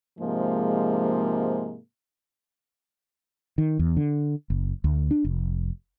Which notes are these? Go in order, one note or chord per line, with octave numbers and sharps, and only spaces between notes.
G#2 C3 F3 G#3 A#3
D#3
E2
D3
F#1
D2
D4
F1